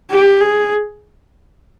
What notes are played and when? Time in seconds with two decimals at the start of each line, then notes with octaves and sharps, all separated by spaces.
0.11 G4
0.41 G#4